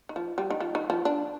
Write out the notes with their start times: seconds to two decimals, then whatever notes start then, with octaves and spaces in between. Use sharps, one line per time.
0.09 D#3
0.16 F3
0.38 G3
0.50 D#3
0.61 F3
0.75 D#3
0.90 F3
1.05 D4